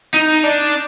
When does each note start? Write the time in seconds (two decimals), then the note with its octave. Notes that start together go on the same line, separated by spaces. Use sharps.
0.14 D#4
0.43 D4